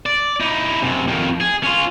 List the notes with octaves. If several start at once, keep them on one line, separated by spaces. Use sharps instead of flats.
D5
D#4 E4
F#2 C3
F2 D#3
G#4
C#4 F4